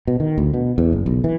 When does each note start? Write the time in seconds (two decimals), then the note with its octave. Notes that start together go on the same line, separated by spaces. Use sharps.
0.07 B2
0.20 D#3
0.38 D2
0.53 B2
0.78 E2
0.92 F#1
1.06 B1
1.24 E3